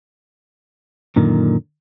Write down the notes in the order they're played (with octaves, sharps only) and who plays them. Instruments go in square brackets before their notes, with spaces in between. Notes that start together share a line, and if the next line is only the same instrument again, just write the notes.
[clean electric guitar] F#2 A#2 D3 D#3